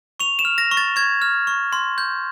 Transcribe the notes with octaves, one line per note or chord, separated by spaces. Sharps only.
C#6 F7
E7
F6
A#6
C#6
A6
C#6 G#6
F6
C#6
C6
G6